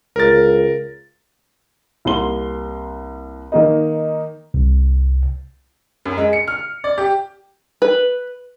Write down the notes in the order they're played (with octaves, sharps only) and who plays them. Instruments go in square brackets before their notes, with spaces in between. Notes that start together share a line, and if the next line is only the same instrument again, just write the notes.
[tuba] C#2 [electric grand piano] A#4 A6
[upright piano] C2 A#3 C6 G7
D#3 A#3 D#4
[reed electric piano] C2
[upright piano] F#2
G#3
C#7
F6
D5
G4
[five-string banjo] B4